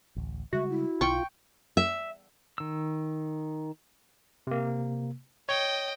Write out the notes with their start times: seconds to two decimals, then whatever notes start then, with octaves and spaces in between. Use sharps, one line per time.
0.16 A1 D2
0.53 C#3 G3 G#3 F#4 E5
0.69 E4
1.01 B1 F4 G5 C#6
1.77 E5
2.58 D#3 E6
4.47 C3 A#3
5.49 C#5 D#5 G5